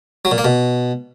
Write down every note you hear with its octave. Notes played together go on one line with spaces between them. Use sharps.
F#3
A#2
A#3
B2